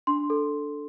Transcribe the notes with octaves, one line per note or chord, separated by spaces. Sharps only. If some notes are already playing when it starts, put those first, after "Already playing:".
D4 C6
A4